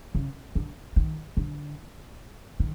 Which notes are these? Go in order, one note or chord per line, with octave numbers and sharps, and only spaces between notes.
C#3
D3
D#3
D3
D#3